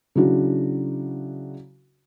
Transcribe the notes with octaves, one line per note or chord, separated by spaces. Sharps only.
C#3 F#3 D4 E4 F#4